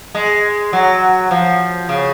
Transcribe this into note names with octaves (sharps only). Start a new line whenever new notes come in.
G#3
F#3
F3
C#3